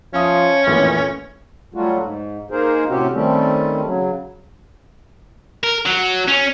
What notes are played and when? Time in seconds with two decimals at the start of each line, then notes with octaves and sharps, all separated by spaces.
0.14 F3 C#4 E5 F5 D#6
0.67 A1 F2 A#2 E3
1.74 F#3 G3 A3 F4 F#4
1.99 G#2
2.51 A#3 D#4 G#4 A#4 C5
2.89 A2 C3 C4 C#4 F#4 G4
3.13 D#3 G3 A3 C4 C#4
3.85 C#3 F#3
5.64 A#4
5.86 F#3
6.28 C#4